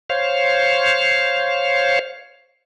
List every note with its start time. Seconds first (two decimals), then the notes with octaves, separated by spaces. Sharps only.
0.10 C5 C#5 F5